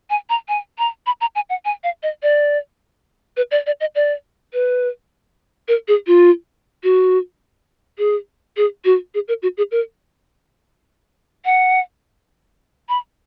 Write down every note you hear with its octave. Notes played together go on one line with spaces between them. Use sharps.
G#5
A#5
G#5
A#5
B5
A#5
G#5
F#5
G#5
F5
D#5
D5
B4
D5
D5
D#5
D5
B4
A#4
G#4
F4
F#4
G#4
G#4
F#4
G#4
A#4
F#4
G#4
A#4
F#5
B5